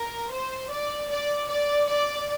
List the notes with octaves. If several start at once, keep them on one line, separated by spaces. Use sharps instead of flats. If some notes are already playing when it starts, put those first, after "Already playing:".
Already playing: A#4
C5
D5
D5
D5
D5